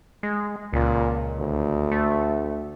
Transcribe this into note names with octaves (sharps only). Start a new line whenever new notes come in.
G#3
C#2 A#2
D2
A3